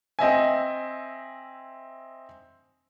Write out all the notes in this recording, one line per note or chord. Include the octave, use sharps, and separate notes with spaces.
C4 D#5 E5 G#5